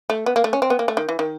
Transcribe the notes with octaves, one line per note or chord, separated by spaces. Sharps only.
A3
B3
A#3
A3
C#4
C4
B3
A#3
A3
D#3
E3
D#3